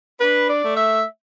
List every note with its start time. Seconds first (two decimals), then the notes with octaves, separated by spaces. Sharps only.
0.20 D4 B4
0.49 D5
0.63 A3
0.77 E5